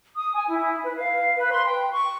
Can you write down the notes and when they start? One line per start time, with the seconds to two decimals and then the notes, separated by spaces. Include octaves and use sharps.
0.16 D#6
0.35 G#5
0.48 E4
0.84 B4
0.98 F5
1.36 B4
1.52 C6
1.66 G5
1.91 C#6